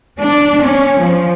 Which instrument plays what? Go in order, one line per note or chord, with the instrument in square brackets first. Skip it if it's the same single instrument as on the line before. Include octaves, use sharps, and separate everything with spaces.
[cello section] D4
C#4
F3